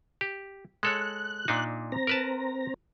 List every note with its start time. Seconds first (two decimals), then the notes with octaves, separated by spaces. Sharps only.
0.21 G4
0.83 G#3 A4 C#5 F#6
1.48 A#2 D4 D#4
1.92 C4 A#5
2.07 A#4 B4 A5